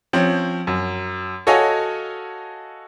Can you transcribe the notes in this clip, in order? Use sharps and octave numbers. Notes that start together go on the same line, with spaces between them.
F3 C4 C#4
F#2
F#4 A4 C#5 D#5 F5 G#5